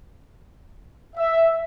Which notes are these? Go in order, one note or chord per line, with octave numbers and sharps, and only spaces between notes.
E5